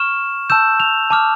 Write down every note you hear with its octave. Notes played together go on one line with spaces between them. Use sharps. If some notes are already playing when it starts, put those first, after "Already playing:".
Already playing: C#6 F6 E7
A5 E6 G6 E7
F7
A5 D6 F6